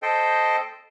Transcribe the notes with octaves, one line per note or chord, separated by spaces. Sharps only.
A4 C5 D#5 G5